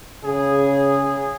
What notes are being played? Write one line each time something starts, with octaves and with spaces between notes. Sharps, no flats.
C#3 G#4